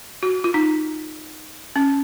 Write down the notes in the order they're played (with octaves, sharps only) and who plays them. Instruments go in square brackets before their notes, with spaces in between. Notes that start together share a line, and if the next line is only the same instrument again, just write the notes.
[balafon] F#4
F4
D#4
C#4